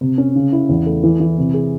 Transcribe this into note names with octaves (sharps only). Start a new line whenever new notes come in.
C3
C#4
C#3
E4
E2
A3
E3
E3
C3
G#4